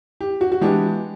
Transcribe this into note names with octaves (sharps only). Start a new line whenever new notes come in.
G4
F#4
F#4
E3 G#3 B3 D4 G4